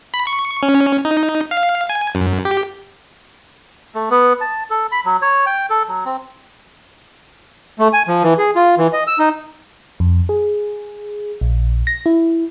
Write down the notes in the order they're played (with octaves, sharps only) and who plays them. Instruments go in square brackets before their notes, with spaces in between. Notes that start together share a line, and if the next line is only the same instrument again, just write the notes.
[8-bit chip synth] B5
C#6
C#4
D#4
F5
G#5
F#2
G4
[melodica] A3
B3
A5
A4
B5
F#3
C#5
G5
A4
F#3
C4
[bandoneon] A3
G#5
F3
E3
G#4
F4
E3
D#5
E6
D#4
[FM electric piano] F2
G#4
A#1
A#6
E4